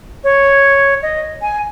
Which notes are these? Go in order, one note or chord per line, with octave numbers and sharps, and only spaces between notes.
C#5
D#5
G#5